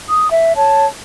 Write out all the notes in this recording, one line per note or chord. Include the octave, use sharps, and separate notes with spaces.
D#6
E5
C#5 A5